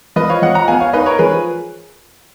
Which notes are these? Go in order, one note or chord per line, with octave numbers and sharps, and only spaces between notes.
F3 B4 D#5
C#5 F5
F3 D#5 F#5
F#5 A#5
B3 F5 G#5
C#5 F5
D#4 B4 D#5
A#4 C#5
F3 G#4 B4